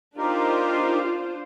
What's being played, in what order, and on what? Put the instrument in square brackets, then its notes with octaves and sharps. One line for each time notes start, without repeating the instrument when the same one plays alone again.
[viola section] D4 F4 C5 [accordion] D#4 G4 A#4